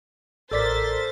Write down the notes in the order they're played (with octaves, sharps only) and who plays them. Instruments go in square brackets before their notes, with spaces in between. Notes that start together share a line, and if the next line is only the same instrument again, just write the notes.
[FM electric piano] A1 D5 B6 [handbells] A4 A#4 [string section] C5 A6